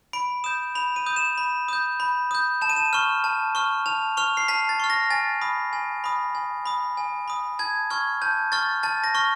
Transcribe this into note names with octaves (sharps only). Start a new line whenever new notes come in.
B5 D7
D#6 G6 E7
B5 F7
D#7
D#6 G6
E7
B5
D#6 G6
B5
D#6 G6
A5 E7
D#7
E7
C#6 F6
A5
C#6 F6
A5 F7
C#6 F6 F7
C7
A5 B6
A6
C#6 F6
A#6
G#5 A6
B5 D#6
G#5
B5 D#6
G#5
B5 D#6
G#5
B5 D#6
A5 G#6
C#6 F6 G#6
A5 G6
C#6 F6 A6
A5 A6
A#6
C#6 F6